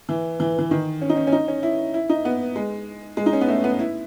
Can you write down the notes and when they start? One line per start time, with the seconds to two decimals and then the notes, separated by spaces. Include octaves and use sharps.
0.09 E3
0.40 E3
0.59 E3
0.71 D#3
1.02 C#4
1.09 D#4
1.17 C#4
1.27 C#4
1.32 D#4
1.48 C#4
1.63 E4
1.94 E4
2.09 D#4
2.25 B3
2.56 G#3
3.17 G#3
3.26 D#4
3.33 C#4
3.41 B3
3.48 A3
3.64 B3
3.79 E4